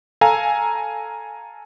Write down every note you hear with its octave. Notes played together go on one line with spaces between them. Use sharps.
A4 F5 G#5 A#5